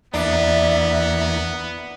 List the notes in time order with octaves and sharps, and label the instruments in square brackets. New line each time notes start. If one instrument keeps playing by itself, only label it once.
[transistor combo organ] E2 A#3 [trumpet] B3 [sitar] D4 [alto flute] E5